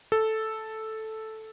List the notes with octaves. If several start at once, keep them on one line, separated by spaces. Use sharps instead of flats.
A4